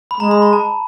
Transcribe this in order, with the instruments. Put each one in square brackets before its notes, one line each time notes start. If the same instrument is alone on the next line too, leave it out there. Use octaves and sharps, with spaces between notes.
[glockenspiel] B5
[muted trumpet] G#3 [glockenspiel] A#5
[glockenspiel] B5
A#5
A5